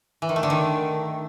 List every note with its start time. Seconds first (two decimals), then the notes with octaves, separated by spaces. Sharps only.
0.22 E3
0.29 D#3
0.36 A3
0.43 D3
0.50 D#3